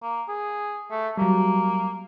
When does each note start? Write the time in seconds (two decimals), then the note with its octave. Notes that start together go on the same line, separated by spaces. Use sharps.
0.02 A#3
0.28 G#4
0.91 A3
1.17 F#3 G3 A#3